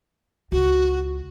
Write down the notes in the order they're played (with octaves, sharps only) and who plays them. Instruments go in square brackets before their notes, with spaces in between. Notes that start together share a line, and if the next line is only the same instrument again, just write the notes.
[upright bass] C#2 [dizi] F#4